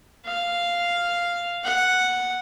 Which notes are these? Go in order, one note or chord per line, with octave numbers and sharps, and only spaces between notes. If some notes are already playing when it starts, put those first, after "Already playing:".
F5
F#5